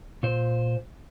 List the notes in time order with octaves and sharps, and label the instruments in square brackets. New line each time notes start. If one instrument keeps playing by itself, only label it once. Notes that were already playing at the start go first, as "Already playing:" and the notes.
[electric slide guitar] A#2 C5